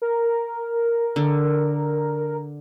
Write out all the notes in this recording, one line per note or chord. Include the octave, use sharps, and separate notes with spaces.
A#4
D3